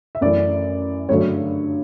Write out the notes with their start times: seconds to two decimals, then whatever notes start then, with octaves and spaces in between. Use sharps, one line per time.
0.15 E5
0.21 F#2 E3 A3 D5
1.09 G2 D3 F#3 A3 C#5